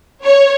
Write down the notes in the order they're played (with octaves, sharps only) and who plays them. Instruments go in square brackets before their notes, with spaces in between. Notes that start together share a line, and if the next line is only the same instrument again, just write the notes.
[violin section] C#5